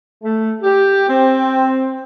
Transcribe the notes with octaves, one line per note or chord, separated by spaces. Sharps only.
A3
G4
C4